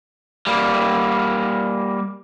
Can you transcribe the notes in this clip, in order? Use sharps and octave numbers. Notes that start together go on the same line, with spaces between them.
G3 A#3